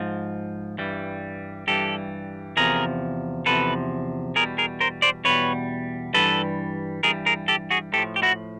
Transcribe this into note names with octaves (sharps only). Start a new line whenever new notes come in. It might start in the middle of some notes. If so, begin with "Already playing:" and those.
Already playing: G#2 F3
G2 E3 G3
G2 E3 G3 G4 A4
E2 C3 F3 G#4 A#4
E2 C3 F3 A4 B4
E2 B2 G3 G#4 A#4
G#4 A#4
A#4 C5
C5 D5
E2 B2 G3 B4 C#5
G2 E3 G3 A4 B4
G2 E3 G3 G#4 A#4
G#4 A#4
G4 A4
F#4 G#4
A2 F3 G4 A4
G4
E4 F#4